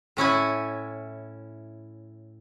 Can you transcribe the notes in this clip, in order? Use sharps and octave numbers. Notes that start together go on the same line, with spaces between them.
A2 C#4 E4 G#5